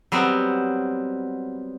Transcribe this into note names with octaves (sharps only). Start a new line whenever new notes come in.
F#3 G3 B3 C4